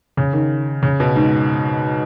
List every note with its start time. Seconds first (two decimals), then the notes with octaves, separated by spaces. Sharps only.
0.17 C#3
0.33 D#3
0.83 C#3
1.00 B2
1.16 G#2